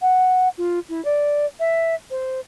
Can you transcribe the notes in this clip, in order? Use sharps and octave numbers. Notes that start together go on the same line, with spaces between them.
F#5
F4
E4
D5
E5
C5